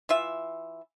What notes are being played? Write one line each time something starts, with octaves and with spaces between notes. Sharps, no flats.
E3 F4 E5